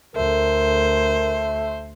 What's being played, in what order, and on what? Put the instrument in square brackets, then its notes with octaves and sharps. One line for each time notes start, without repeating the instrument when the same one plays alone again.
[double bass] D2 [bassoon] A3 [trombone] A#4 [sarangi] C5